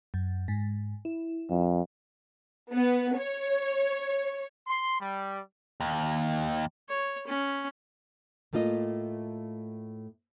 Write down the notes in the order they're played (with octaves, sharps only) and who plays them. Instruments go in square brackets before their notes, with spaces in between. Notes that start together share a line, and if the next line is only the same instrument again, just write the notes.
[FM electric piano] F#2
G#2
E4
[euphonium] F2
[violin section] B3
C#5
[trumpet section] C6
G3
[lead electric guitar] D#2
[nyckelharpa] C#5
C#4
[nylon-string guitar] A2 A3 A#3 F4 A#4 D#5